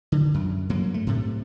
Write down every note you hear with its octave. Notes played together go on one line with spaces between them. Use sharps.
D3
F#2
G2 F#3 A#3
A3
A2 C3